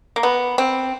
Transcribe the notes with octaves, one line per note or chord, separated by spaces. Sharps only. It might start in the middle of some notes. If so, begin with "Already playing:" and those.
A#3
B3
C4